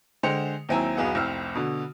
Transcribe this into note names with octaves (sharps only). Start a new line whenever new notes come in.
D3 G#3 C5 G5 C#7 F7
D#2 F#3 C4 E4 G#5 A#5
E1 B1 B3 G#4 F#5
F1 C2 C4 E6 F6
B2 D3